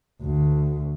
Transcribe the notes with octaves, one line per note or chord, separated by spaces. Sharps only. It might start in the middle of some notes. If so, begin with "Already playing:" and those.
D2